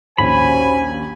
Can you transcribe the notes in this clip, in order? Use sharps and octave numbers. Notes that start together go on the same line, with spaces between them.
A#1 D#2 C#4 F#4 C5 G#5 B5